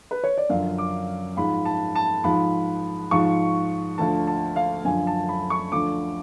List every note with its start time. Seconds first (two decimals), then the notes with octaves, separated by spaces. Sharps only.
0.11 B4
0.24 C#5
0.38 D5
0.49 F#2 D3 F3 F5
0.78 D6
1.37 G#2 F3 B5
1.65 A5
1.95 A5
2.24 G#2 F3 B5
3.11 G#2 F3 C#6
3.98 D2 D3 F3 A5
4.27 A5
4.56 F5
4.84 F#2 D3 F3 G#5
5.07 A5
5.29 B5
5.50 C#6
5.72 D2 D3 F3 D6